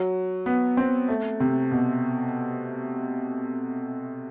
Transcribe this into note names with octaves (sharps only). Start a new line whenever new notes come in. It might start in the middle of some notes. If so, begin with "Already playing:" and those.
Already playing: F#3
B3
C4
A3
C3
B2